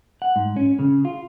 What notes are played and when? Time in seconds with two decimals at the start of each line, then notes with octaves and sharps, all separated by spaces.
0.22 F#5
0.36 G#2
0.56 C#4
0.79 C#3
1.05 F4